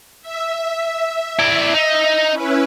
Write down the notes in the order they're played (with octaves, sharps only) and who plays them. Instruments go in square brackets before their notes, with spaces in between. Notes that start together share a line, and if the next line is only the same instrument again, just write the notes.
[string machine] E5
[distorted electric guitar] E4 D5
D#4
[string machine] C#4 E4 B4